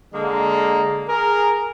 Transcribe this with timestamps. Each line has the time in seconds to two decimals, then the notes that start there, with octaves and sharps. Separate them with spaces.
0.13 D3 G#3 A#3
1.07 G#4 A#4